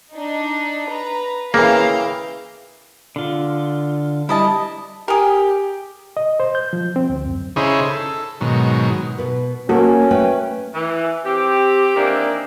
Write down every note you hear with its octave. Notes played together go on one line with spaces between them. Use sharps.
D4 D#4
B4 A#5
C#3 E3 A#3 F5 G5 A#5
D3 F4
G3 E4 D#5 A5
G4 G#4 A#4
D#5
C5
G6
F3
C4
D2
F#2
C#3 D#4 E4 G#4 C5 C#5
A4
G#2 B2 D#3 F#3
B2 B4
A#3 C#4 F#4 A4
A3 B4 G5
E3
C4 G4
D#3 E3 A#3 C4 D4